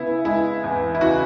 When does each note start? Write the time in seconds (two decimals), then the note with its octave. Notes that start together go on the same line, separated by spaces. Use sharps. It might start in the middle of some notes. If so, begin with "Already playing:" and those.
Already playing: C#3 B3 E4
0.25 G#3 E4
0.64 E2
0.95 E4
1.01 C#3 F#4